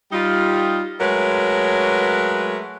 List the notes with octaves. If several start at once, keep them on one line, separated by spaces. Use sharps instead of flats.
G3 D#4 F4
F#3 G#3 A3 A#4 B4 C#5